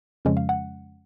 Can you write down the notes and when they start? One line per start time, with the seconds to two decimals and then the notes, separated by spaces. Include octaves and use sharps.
0.25 F2 C#3 F3 G#3 C#4
0.37 F5
0.49 F#5